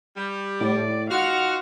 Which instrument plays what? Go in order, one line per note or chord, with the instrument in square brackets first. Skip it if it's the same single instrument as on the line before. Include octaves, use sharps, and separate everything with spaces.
[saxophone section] G3
[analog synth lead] A2 [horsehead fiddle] D5
[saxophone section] D#4 F4 F#4 [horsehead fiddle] F5 F#5 [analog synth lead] F6